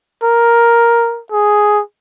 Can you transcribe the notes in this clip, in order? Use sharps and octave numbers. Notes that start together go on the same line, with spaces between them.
A#4
G#4